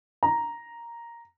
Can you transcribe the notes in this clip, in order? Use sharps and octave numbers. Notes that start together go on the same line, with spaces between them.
A#5